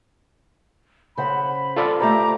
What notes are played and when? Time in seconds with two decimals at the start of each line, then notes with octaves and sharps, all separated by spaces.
1.17 C#3 C5 F#5 B5
1.76 F4 A4 D5
2.00 A3 G4 C5 A#5 D6